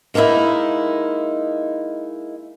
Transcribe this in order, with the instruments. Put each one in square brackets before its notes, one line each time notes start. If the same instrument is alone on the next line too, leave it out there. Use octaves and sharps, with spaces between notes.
[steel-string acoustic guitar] G#3 A#3 C#4 D#4 E4